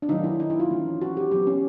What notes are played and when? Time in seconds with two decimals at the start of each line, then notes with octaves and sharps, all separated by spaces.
0.02 D4
0.09 D#3 F#3 A3 D#4
0.24 E4
0.40 D#4
0.50 E4
0.60 F4
0.70 E3 A3 C#4
1.02 F#4
1.17 G4
1.31 F#3 B3 G4
1.47 C#4